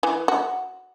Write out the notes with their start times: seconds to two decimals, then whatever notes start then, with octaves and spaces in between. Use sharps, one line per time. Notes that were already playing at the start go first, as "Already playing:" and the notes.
0.03 E3
0.28 F#4